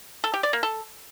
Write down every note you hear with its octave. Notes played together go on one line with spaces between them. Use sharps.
A4
G4
D5
A#3
A4